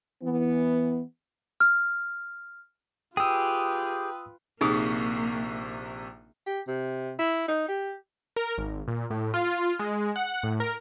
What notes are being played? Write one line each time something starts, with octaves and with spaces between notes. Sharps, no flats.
E3 B3
F6
F4 G4 G#4 B4 G5 D#6 E6
A#1 C3 A#3 D#4 G#4 C#6 D#6
G4
C3
E4
D#4
G4
A#4
G#1
A#2
A2
F4
G#3
F#5
A2
A#4